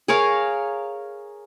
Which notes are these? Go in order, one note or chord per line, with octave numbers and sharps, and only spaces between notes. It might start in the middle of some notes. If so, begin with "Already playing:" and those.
G#4 A#4 C#5 F5